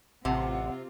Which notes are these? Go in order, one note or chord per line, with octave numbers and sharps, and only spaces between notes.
A1 C3 C4 F4 F#5